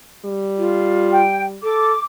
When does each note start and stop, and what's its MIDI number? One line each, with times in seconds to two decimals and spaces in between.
0.25 1.59 55
0.58 1.22 65
1.12 1.43 79
1.63 1.91 69
1.63 2.02 86